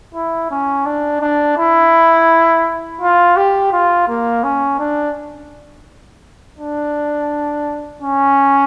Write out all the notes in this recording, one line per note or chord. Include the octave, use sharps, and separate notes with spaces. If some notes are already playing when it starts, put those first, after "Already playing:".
E4
C#4
D4
D4
E4
F4
G4
F4
A#3
C#4
D4
D4
C#4